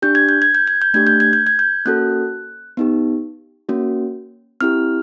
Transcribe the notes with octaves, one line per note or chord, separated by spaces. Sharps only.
D4 G4 G6
G#6
G6
G#6
G6
G#6
G6
A3 D4 G4 G#6
G6
G#6
G6
G#6
G6
A#3 C#4 F#4 A4 F#6
B3 D#4 G4
A#3 C#4 F#4
C4 E4 G4 F6